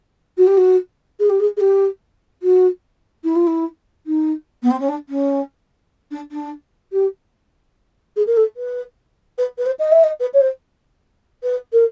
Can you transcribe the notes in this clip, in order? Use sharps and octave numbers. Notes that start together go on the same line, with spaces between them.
F#4
G4
F#4
G#4
G4
G#4
G#4
G4
F#4
E4
F4
E4
D#4
B3
C4
C#4
D4
C#4
D4
D4
G4
G#4
A#4
A4
B4
B4
B4
C5
D#5
E5
D#5
B4
C#5
C5
B4
A#4